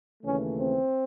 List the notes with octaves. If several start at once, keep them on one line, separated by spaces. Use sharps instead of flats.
D#2 C#3 E3 A3 C#4
C4